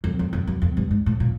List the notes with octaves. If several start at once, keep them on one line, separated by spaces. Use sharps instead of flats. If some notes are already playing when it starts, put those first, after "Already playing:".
F2
F2
F2
F#2
F2
G2
G#2
A2
A#2